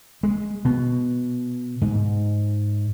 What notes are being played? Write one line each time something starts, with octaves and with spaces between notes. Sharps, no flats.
G#3
B2
G#2